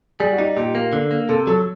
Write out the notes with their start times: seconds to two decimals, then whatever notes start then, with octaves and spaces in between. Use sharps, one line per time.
0.20 G3 G#4
0.32 F#4
0.38 D#4 G4
0.57 A#2 G4
0.75 A#3
0.93 D3
1.11 A#3
1.29 C3 A4
1.47 F#3 A4